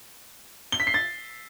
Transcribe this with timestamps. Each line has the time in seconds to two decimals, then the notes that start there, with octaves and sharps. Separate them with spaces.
0.72 G7
0.80 B6
0.87 C7
0.94 A6